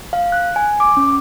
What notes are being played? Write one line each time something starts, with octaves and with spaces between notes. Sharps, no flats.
F5
F#6
G#5
D6
C#4